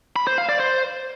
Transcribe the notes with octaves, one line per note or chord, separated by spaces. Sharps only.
B5
C5
F5
D5
C5